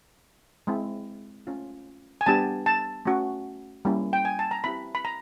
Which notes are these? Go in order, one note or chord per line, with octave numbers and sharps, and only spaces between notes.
G#3 C4 E4
A3 C#4 F4
G#5
G3 B3 D4 G4 A5
A5
A3 C#4 F#4
G3 A#3 C#4 E4
G5
G#5
A5
A#5
C4 E4 G4 B5
B5
A#5